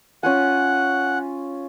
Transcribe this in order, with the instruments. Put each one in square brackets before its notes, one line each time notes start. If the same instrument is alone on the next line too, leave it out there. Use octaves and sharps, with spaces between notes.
[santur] C#4 F4 G#5 [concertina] F#5